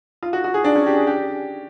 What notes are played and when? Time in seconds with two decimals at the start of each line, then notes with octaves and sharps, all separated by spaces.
0.23 F4
0.33 F#4
0.44 F#4
0.54 G#4
0.64 D4
0.76 C#4
0.87 G4
0.96 G#4
1.07 G4